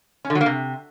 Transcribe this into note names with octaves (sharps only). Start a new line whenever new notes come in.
C#4
D3
F#3
A#3
C3